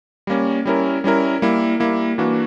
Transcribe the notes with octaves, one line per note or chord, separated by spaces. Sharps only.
G3 A#3 C#4
G3 C#4 E4 A#4
G3 C#4 E4 A#4
G3 A#3 E4
G3 A#3 E4
E3 A#3 D4 F#4